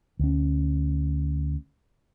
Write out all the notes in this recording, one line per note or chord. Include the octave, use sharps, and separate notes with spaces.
D2 C#4